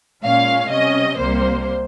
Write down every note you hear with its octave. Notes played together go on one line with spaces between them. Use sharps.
A#2 G#3 C#4 F5
C3 G3 C#4 D#5
C2 C3 G3 A#3 C5